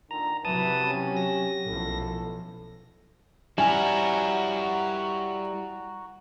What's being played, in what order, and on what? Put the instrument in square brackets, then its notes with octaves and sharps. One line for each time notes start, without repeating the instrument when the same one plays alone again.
[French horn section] A#2 D3 D#3 [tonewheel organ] A#5
[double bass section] C3 F#3 [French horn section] E3 B4 [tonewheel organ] A5 D#6
[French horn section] C#4 G4
[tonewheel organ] A#6
[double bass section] B1 F3 [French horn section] F#2 A2 A4
[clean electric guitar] G3 E4 [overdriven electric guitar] F#4 A#4 [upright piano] G#5